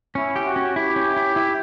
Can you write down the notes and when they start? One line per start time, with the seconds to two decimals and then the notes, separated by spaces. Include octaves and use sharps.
0.15 C#4 E4
0.36 G4
0.46 F#4
0.56 C#4
0.76 E4 G4
0.96 C#4
1.16 E4
1.36 E4